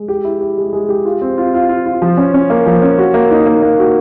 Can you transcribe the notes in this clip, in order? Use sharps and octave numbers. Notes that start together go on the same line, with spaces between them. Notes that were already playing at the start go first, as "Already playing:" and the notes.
Already playing: G#3
G4
E4
G4
G#3
G#3
G4
F4
C4
F4
F4
F4
F4
F3
C#4
C#4
A#3
F3
C#4
F#4
A#3
D#4
A#3
A#3
F#4